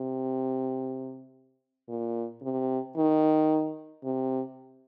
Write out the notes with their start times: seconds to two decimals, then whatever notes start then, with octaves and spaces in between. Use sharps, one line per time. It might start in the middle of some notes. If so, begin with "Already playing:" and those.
Already playing: C3
1.89 A#2
2.42 C3
2.97 D#3
4.04 C3